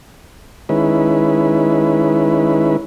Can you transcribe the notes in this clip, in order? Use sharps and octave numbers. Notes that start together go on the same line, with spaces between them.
D#3 G#3 C#4 E4 B4